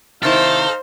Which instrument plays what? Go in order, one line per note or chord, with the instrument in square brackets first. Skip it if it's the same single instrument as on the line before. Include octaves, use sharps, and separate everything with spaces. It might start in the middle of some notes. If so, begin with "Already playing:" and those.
[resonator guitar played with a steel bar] C3 D#3 E4 [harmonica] D#4 F5 F6 [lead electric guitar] A4 [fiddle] C5